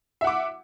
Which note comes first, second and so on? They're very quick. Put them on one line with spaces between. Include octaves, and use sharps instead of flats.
E5 F#5 D6